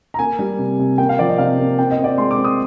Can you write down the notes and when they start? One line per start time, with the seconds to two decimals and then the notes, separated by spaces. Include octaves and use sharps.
0.14 A#5
0.19 A#3 G#5
0.39 G3
0.59 C3
0.79 C3
0.98 A#3 G5
1.09 F5
1.19 F3 D5
1.29 D#5
1.38 C3 F5
1.59 A#3
1.79 C4 G5
1.91 D#5
1.97 C4
2.04 D5
2.18 G#3 C6
2.31 D6
2.37 C4
2.44 D#6